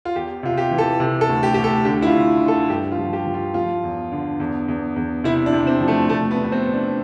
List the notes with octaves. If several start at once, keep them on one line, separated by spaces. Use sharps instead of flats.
F4
E2 G4
C3 F4
G4
E3
A4
C3
A4
D2
G4
D2 G4
A4
D3 G4
E4
F4
D3
D3
A4
G2 G4
F4
F3
G4
F3
F4
F3 F4
E2
D3
E2
E2
E2
C3 E4
D4
C3
C4
F3
A3
C3 A3
B3
E2
B3
C4
E2
D4